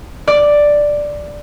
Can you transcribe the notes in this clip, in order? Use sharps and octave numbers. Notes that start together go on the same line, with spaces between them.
D5